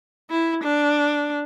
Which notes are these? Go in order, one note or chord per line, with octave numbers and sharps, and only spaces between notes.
E4
D4